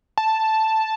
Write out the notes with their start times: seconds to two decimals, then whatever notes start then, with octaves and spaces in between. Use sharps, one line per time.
0.17 A5